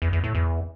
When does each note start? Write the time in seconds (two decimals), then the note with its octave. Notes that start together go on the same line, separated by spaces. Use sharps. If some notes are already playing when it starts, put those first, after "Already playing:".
0.02 E2
0.13 E2
0.24 A2
0.35 E2